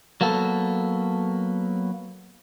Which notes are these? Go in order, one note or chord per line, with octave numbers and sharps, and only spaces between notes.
F#3 A#3 B3 A4